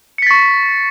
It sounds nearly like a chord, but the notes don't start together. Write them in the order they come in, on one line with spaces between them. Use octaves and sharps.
C#7 B6 A6 C#6